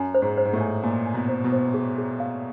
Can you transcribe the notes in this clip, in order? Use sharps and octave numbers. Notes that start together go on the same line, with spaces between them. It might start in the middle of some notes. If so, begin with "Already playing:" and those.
Already playing: F#2 G#5
C5
G#2
C5
G#2
A2
G#5
A#2 G#5
G#5
B2
C5
B2
C5
G#4
G#4
F5